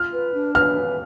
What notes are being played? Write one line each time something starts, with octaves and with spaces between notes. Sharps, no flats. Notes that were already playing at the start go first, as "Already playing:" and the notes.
Already playing: F4 F6
B4
D4
B4 F6